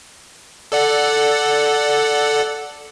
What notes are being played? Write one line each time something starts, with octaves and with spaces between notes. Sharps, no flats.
A4 D5 F#5